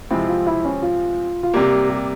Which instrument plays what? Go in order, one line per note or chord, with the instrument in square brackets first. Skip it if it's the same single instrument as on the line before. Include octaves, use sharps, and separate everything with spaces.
[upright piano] C3 F3 G#3 C4 [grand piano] E4
[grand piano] F4
E4
C#4
F4
F4
[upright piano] C3 G3 A#3 [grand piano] G4
[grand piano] G4